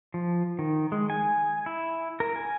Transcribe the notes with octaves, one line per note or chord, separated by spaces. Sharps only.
F3
D#3
G#3
G#5
E4
A#4
G#5